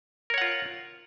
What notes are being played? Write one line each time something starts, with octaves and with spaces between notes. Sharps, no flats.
F4 A#4 C#5 F#5